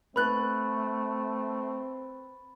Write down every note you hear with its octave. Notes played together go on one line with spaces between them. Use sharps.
A3 C4 B4 B5 F#6 A6